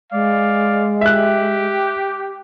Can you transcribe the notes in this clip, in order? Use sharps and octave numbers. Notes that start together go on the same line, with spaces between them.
G#3 D5 F5
G4 E5 F#6